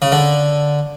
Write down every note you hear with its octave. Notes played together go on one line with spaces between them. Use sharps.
C#3
D3